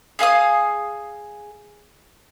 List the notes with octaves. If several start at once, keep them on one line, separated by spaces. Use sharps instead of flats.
G#4 F5 G#5 D#6